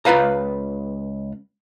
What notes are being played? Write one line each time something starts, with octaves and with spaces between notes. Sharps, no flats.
C#2 F4 B4 F5 A#5